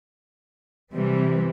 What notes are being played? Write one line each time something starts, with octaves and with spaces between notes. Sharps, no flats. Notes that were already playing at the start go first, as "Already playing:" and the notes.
C3 E3 G3